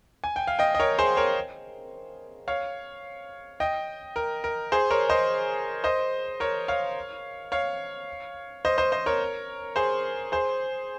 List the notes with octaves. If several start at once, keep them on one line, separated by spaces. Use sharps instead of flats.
G#5
G5
F5
D#5 G5
D#5
A#4 C#5
G#4 C5
A#4 C#5
C#5 F5
D#5 G5
A#4
A#4
G#4 C5
A#4 C#5
C5 D#5
C5 D#5
A#4 C#5
C#5 F5
C#5 F5
C5 D#5
C5 D#5
C5 D#5
A#4 C#5
G#4 C5
G#4 C5